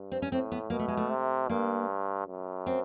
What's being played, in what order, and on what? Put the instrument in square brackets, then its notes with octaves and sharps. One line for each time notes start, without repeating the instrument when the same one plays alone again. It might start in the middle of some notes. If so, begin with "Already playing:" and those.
Already playing: [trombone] G2
[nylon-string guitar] C4
C#4
[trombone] A2 [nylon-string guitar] C4
[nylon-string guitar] B3
[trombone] B2 [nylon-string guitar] A#3
[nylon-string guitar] A3
G#3
A3
[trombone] C3
[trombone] G2 [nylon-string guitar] A#3
[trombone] F#2
[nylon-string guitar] C4